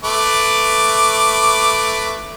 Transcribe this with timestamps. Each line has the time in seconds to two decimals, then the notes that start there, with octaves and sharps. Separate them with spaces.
0.04 A3 B4 D6